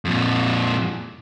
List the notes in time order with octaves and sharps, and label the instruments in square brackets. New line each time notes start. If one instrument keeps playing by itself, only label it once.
[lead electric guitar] F2 A#2